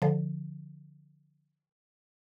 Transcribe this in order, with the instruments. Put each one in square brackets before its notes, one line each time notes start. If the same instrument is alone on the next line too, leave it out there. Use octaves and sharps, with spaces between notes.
[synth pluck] D3 F3